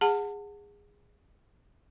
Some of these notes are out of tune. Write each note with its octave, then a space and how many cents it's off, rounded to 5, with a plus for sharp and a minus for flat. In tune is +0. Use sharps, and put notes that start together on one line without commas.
G#4 -20 F#5 -15 A5 +30